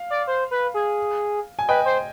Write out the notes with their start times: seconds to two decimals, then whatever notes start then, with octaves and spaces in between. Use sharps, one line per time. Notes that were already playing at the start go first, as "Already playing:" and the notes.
Already playing: F5
0.10 D5
0.27 C5
0.51 B4
0.74 G#4
1.59 G#5
1.68 B4 D#5 G5
1.85 C5